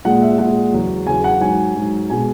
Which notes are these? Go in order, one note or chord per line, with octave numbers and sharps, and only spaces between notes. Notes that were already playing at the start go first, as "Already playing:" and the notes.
A#2 G#3 F#5
E5
A#2 G#3 F#5
E2 C#3 F#3
E2 C#3 F#3 G#5
F#5
G#2 F#3 G#5
G#2 F#3
B2 G#3 G#5